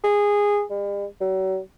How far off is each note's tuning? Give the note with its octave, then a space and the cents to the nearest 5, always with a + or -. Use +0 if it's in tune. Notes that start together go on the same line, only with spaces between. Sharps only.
G#4 -15
G3 +45
F#3 +40